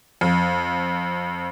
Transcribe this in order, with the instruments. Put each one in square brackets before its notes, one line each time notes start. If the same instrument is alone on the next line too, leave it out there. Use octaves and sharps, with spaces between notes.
[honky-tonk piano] F2